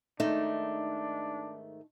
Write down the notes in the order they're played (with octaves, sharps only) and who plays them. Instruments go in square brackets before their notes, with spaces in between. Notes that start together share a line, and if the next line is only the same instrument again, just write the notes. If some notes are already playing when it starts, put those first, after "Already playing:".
[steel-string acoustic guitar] G#2 D#3 A3 [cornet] D4 [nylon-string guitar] D#4